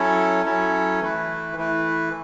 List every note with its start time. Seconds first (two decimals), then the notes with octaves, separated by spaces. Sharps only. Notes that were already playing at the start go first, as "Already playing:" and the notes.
Already playing: F#3 C#4 E4 A4 C#5
0.45 F#3 C#4 E4 A4 C#5
1.01 E3 A3 E4 B4
1.56 E3 A3 E4 B4